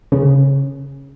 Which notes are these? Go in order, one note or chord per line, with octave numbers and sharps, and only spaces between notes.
C#3